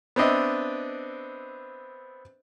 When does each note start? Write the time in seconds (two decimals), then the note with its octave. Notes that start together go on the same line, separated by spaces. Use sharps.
0.16 B3 C4 D4 D#5 E5